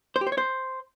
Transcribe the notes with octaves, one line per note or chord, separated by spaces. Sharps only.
C5
G4
C5
C#5
C5